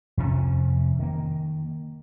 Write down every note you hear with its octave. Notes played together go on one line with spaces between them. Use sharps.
F2 C3 C#4
D#3 A#3